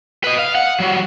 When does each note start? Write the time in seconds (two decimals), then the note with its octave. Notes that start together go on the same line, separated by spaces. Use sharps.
0.24 B4 D#5
0.39 F5
0.55 F#5
0.80 F#3 G3